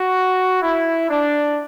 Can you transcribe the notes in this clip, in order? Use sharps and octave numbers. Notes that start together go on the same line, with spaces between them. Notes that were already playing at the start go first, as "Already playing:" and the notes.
Already playing: F#4
E4
D4